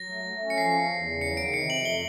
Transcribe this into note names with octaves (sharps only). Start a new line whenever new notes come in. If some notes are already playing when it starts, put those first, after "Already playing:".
Already playing: F#3 A#6
A3
A3
C#4
C#7
F3 C7
E2
E2
C#3
F#3 C#7
D#3 D7
C3 C#7
F2 F#7
A3 G7